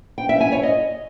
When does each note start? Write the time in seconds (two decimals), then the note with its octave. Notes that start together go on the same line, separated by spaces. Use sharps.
0.18 G5
0.29 E5
0.41 G#5
0.52 C#5
0.63 D#5